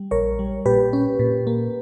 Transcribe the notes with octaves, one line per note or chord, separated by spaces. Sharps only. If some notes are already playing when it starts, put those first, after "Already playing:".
Already playing: G3
A#1 A#4 C#5
G3
A#2 G4 B4
C#4
A#2
A#3